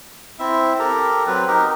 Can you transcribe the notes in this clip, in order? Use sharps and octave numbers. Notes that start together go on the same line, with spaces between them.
C4 E4 E5
G4 A4 A#4 A#5
F#3 C4 B4
D#4 G4 A#4